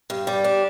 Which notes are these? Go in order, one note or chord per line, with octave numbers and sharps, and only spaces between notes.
G2
G3
D4